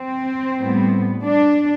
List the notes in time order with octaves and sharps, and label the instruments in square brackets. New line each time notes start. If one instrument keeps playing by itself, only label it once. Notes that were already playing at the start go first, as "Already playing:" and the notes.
Already playing: [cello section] C4
A2 G3 B3
D4